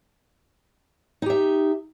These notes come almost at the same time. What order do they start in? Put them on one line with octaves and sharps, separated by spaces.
D#4 G4 E5